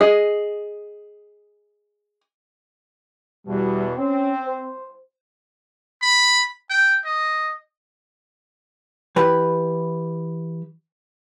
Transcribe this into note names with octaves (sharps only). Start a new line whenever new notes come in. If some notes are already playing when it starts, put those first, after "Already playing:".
G#4 D#5
E2 B2 G3
C4 C#4
C5
B5
G5
D#5
E3 G4 B4